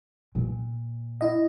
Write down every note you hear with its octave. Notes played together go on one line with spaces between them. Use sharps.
A#2
E4 D#5